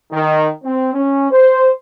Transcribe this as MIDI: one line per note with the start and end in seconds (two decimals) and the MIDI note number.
0.11 0.48 51
0.64 0.92 60
0.93 1.30 61
1.31 1.70 72